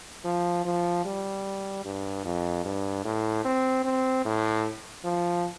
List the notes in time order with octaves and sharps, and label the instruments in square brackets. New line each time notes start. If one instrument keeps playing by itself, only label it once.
[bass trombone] F3
F3
G3
G2
F2
G2
A2
C4
C4
A2
F3